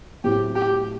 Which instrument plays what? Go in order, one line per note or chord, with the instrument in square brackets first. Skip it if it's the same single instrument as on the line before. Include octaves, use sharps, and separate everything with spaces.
[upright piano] A2 F#3 A3 C4 [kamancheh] G4
[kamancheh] G4